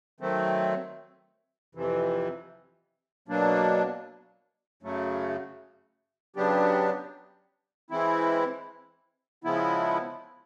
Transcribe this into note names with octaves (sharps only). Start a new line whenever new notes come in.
D#3 F#3 A3 C4
F2 C3 E3
B2 F#3 A#3 D4
F#2 C#3 F#3 A3
C#3 F#3 B3 D4 G4
E3 G#3 C4 E4
C#3 F3 G#3 B3 E4